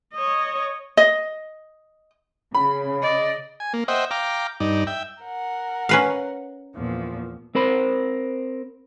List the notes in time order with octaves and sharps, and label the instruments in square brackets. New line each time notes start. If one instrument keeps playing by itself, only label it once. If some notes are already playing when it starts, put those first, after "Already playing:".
[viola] C#5 D#5
[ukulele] D#5
[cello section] C#3 [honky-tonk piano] B5
[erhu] D5 [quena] D#5
[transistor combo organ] G#5
A#3
C5 D#5 E5 F#5 G5
F5 G5 A#5 D6
G2 D#4 D5
E5 G5
[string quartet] A#4 F#5
[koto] C#4 B4 F5
[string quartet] E2 A#2 F3
[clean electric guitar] C4 A#4 C5 B5